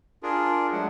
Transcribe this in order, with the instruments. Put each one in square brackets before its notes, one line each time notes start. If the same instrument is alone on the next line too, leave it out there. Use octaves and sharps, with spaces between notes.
[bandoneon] D4 F4 G#4 A#4
F#3 G#3 A3 D4 F#5